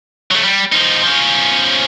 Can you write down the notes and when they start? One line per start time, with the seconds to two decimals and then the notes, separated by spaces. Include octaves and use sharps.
0.31 F#3 A3
0.44 G3
0.72 F3 D#4
1.03 F3 C#4